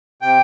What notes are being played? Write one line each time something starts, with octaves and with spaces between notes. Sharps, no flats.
C3 G5